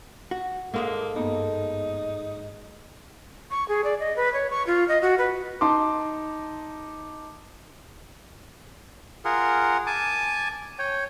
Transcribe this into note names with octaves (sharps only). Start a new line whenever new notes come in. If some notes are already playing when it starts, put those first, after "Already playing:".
F#4
G#2 G#3 A#3 A4 E5
G2 A#3 B3 D#4
C#6
G#4
D5
D#5
B4
C#5
C#6
F4
D#5
F#4
B4
D#4 A5 C6 D6
F4 G#4 A#4 F#5
G#5 A5 D6
C#5 G5